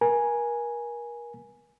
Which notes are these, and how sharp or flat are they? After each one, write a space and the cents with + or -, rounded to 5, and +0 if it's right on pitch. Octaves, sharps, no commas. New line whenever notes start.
A#4 +35 G#5 +0